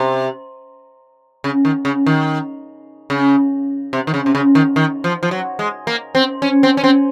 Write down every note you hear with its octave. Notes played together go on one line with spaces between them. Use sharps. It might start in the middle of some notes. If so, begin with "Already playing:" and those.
Already playing: C3
C#3
D#3
C#3
D#3
C#3
C3
D#3
C#3
C3
C#3
D#3
D#3
F3
F3
F#3
G#3
A#3
C4
C#4
C4
C#4
C4